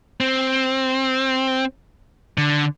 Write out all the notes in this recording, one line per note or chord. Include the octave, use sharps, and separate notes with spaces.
C4
D3